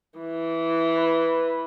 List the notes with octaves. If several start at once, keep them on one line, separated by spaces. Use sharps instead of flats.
E3
B4